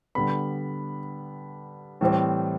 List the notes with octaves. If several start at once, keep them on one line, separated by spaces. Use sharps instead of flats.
D3 G3 B3 B5
A2 E3 G3 C4